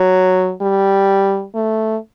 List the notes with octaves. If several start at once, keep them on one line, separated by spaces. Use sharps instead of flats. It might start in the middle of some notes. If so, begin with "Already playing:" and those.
Already playing: F#3
G3
A3